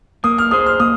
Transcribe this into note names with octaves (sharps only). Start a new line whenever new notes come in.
A#3 D#6
F6
G#4 C5 D#6
F6
A#3 D#6